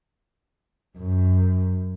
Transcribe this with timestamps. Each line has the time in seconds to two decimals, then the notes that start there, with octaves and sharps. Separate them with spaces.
0.98 F#2